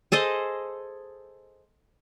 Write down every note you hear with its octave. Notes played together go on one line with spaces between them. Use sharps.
G#4 A4 C5 D#5